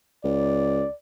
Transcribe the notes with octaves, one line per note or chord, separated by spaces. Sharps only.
C#2 D5